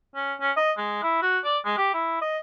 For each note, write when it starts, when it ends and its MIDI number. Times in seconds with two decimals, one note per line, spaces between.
0.15 0.33 61
0.41 0.51 61
0.57 0.72 75
0.78 1.01 56
1.03 1.22 64
1.22 1.39 66
1.44 1.58 74
1.65 1.74 56
1.78 1.89 67
1.94 2.17 64
2.21 2.38 75